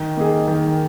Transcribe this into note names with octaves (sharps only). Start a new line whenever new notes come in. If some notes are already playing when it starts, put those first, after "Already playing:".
Already playing: D#3
A#3 D#4 G#4
D#3